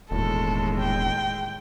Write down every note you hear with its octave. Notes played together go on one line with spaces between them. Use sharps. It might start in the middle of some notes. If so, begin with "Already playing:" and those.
E1 D#2 A2 G#3 A4
G5